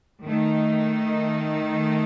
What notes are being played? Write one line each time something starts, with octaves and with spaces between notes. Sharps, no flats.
D#3 A3 D#4